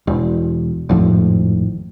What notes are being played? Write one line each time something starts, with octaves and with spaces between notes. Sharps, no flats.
E1
G#1 F2 A2